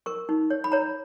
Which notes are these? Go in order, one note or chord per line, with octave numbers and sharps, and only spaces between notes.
A#4 C#6
D#4
C#5
B5
C#5 A#5